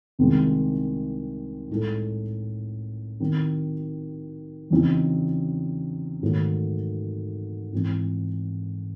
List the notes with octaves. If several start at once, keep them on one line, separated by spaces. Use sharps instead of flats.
C2 C3 D#3 G#3 C4
A2 G#3 D#4 A4
D#3 F#3 C4
E2 C#3 F#3 C4 D#4
G#2 D#3 F#3 A3
G#2 E3 C4